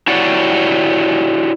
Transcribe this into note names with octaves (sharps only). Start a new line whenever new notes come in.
E4 F#4 G4 C#5 D5 F#5